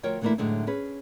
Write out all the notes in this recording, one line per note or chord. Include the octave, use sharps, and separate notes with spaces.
D2 F3 F4 A#4 C#5 G5
D3 E3 A3 A#3 D4 E4
F#2 A2 D3 G#3 E4
C#4 G#4 B4